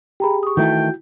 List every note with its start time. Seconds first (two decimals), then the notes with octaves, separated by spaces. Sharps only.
0.20 G4 G#4 G5 A#5 B5
0.43 C#6 D#6
0.57 D#3 E3 A3 E4 F#4 G5